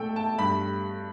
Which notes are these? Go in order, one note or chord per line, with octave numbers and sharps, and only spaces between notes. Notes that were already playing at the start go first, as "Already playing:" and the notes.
Already playing: B2 A3 G5 E6
A5
G2 B5